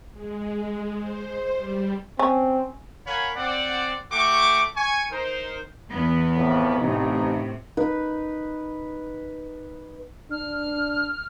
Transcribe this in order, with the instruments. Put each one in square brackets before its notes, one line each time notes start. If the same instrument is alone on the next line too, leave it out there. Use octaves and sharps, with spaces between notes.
[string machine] G#3
C5
G3
[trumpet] C4 [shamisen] C#4
[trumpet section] A#4 C#5 F5 F#5 G#5 B5
C4 D5 F#5
A3 F#4 G5 C#6 D6
G#5 C#6
D#4 A#4 C5
[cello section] E2 B3
[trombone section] F2 A2
[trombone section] A1 D#4 [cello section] A2 C3
[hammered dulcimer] D#4 B4
[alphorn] D4 [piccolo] F6